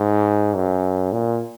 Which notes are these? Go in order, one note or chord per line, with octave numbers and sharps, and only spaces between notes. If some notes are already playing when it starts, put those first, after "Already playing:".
Already playing: G#2
F#2
A#2